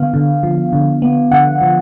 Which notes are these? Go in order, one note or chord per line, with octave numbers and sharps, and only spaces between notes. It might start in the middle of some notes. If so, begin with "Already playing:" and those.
Already playing: D3 B3 F5
D3
F3
D3
B3
D3 F#5
F3